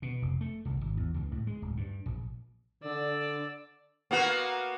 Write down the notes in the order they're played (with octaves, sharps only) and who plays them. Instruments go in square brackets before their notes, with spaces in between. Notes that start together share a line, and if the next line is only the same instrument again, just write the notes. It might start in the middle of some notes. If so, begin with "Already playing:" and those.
[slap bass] B2
F1
A3
C2
G#1
E2
C#2
A2
G#3
D1
G2
A#1
[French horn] D3 [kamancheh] D5 E6
[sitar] A#3 B3 F#4